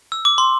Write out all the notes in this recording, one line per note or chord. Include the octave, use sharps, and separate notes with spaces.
E6
D6
C6